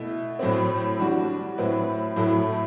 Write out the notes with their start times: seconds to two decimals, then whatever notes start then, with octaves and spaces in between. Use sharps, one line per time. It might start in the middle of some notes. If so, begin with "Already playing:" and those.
Already playing: B2 A3 E4
0.39 A2 F#3 A3 C4
0.99 E3 G3 D4 F#4
1.58 A2 F#3 C4 E4 B4
2.16 A2 F#3 A3 E4 A4